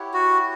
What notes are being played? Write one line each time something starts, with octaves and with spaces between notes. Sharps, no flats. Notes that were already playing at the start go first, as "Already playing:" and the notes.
Already playing: E4 G4 C#5 F#5
F#4